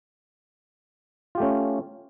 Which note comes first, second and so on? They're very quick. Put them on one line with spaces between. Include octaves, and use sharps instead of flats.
F4 G4 A3 C#4